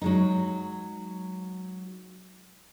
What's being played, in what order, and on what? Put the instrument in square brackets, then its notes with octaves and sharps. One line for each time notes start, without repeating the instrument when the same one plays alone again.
[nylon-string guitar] F#3 G#3 D#4